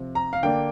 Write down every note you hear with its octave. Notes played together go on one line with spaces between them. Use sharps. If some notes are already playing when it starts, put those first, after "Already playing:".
Already playing: C3 F3 C4
A#5
F5
D3 A#3 D4 G5